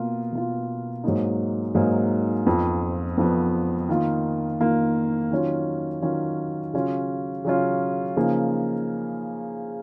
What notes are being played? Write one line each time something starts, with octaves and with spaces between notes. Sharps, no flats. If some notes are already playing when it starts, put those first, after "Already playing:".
Already playing: B2 A#3 F4
B2 A#3 F4
G#2 F#3 A#3 D#4
G#2 F#3 A#3 D#4
F2 F3 B3
F2 F3 B3
D#3 A#3 F4
D#3 A#3 F4
D#3 F#3 C#4 F4
D#3 F#3 C#4 F4
C#3 F#3 C#4 F4
C#3 F#3 C#4 F4
C#3 F3 A#3 D#4